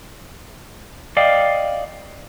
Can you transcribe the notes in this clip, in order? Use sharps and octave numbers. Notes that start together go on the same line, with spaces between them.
D5 D#5 F5 G5